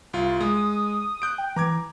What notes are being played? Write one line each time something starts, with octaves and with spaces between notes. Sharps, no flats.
C2 F4
G#3 D#6
F#6 G6 D7
G5
E3 A#5 D6 G#6